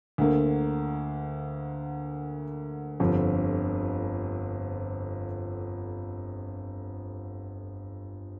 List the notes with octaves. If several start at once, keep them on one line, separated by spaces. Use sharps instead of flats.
D2 D3 A#3
G1 F2 D3 F3